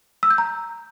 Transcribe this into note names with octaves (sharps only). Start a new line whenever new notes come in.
E6
G6
A#5